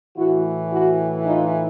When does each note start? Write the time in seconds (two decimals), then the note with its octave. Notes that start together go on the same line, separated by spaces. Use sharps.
0.16 A2 E3 E4 F#4
0.72 E4 F#4
1.26 D#4 F4